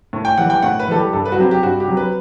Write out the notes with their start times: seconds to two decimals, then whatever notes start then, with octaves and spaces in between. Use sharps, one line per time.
0.13 A2
0.25 G5
0.38 E3 G3 F#5
0.50 G5
0.63 A2 F#5
0.80 B4
0.88 E3 G3 A4
0.96 G4
1.13 G2 A4
1.25 B4
1.32 F#4
1.38 F#3 C4 G4
1.51 G4
1.63 G2 F#4
1.80 G4
1.88 F#3 C4
1.97 B4